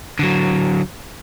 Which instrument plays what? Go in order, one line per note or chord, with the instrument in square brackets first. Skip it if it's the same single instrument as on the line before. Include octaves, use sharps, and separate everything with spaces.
[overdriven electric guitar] D3 F#3